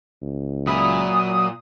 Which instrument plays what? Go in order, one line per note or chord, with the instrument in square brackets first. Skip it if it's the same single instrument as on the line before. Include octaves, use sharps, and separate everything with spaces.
[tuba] C#2
[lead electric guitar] A#2 [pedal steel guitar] F#3 E5 B5 [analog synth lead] D#6